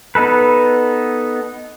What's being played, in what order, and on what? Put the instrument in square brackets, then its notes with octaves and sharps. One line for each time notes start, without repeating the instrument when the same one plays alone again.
[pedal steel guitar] B3 D#4 A4 B4